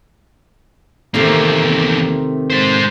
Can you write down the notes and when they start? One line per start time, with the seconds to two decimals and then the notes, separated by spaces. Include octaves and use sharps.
1.14 E2 C3 D#3 A3 A#3
2.50 G#3 C5